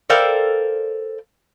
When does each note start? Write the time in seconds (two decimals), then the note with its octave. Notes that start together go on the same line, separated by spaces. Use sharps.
0.10 A4 A#4 C5 D5 F5 G5